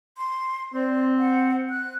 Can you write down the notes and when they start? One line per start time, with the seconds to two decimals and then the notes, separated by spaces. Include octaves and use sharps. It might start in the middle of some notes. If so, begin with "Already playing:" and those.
0.17 C6
0.74 C4 D5
1.18 F#5
1.70 F#6